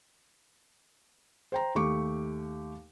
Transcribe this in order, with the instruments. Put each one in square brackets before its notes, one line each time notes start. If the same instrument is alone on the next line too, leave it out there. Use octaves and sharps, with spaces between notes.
[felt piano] C5 G5 A#5
D#2 A3 G4 C#6 D6